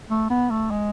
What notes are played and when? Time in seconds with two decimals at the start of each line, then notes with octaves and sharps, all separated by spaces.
0.10 A3
0.30 B3
0.50 A3
0.71 G#3